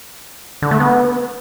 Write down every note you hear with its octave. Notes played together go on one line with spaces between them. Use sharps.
D3
A3
B3